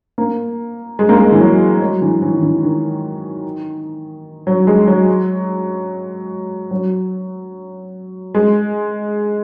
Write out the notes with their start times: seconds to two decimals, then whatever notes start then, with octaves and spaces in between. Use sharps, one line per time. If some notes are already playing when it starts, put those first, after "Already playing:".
0.18 A#3
0.99 G#3
1.09 A#3
1.18 G#3
1.32 E3
1.40 F#3
1.81 F#3
2.02 E3
2.22 E3
2.33 D#3
2.42 E3
2.63 D#3
4.47 F#3
4.67 G#3
4.88 F#3
6.71 F#3
8.35 G#3